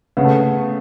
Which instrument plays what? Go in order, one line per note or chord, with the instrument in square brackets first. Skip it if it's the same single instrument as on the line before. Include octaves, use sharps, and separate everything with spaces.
[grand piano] C#3 [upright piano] B3
[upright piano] A3